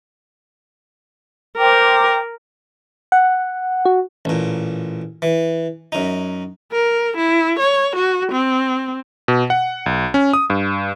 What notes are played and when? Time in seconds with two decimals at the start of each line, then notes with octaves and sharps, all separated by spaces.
1.58 A#4 C5 G5 D6
3.12 F#5
3.86 F#4
4.25 A1 A#2
5.22 E3
5.92 F#2 D#4
6.72 A#4
7.17 E4
7.59 C#5
7.96 F#4
8.32 C4
9.28 B2
9.50 F#5
9.86 B1
10.14 C#4
10.33 D#6
10.50 G2